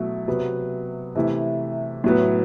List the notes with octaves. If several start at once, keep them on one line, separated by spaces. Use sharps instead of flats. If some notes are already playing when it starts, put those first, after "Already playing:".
Already playing: B2 F#3 A3 E4
C3 F#3 B3
C3 E3 A3 E4
A2 F#3 B3